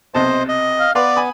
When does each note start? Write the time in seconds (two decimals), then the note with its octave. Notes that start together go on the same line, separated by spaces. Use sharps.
0.14 B1 C3 C5 D#5 A5
0.49 D#5
0.80 F5
0.95 B3 B4 D5 F5 C6
1.16 G#5 B5 D#6